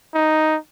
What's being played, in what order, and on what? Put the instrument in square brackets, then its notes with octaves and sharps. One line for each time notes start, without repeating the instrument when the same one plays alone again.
[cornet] D#4